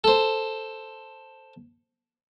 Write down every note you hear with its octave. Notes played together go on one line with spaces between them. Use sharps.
A4 C5